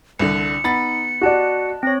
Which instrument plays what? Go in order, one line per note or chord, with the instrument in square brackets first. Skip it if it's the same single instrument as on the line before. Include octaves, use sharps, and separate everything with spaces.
[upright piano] C2 D3 [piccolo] C#7
[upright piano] B3 B5 A6 [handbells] D#4
[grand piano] F#4 D5 [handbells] D#5 A5 F#6
[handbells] C4 C#5 [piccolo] A#6